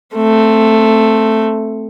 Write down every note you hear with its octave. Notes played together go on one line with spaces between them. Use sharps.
A3 C4